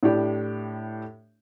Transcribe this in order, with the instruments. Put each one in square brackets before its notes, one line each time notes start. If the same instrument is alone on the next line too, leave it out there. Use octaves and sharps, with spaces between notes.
[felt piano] A2 D4 E4 G4